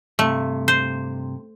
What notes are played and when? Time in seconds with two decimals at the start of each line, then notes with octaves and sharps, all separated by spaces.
0.19 G2 C3 A3
0.68 C5